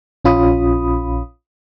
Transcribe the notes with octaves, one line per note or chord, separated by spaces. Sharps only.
A#1 C#4 F4 B5 D#6